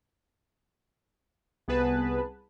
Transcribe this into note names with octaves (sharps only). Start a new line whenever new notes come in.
C2 B3 G#4 B4 A5